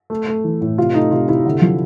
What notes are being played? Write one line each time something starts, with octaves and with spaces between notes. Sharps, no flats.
A3
A3
E3
A2
C3 F4
A3 D#4
C3 F4
C3 E4
D3
F3